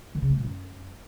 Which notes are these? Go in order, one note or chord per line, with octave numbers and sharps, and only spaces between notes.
D#3
C#3
A3
A#2
F#2